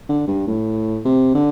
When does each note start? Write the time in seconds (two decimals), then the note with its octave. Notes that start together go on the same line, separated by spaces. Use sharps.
0.09 D3
0.28 G2
0.48 A2
1.05 C3
1.34 D3